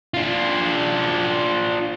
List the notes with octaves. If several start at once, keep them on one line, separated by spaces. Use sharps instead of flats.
D4 F4